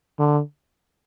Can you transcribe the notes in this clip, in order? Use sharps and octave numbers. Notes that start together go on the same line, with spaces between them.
D3